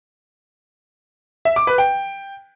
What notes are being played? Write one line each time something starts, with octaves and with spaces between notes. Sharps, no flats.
E5
D6
B4
G5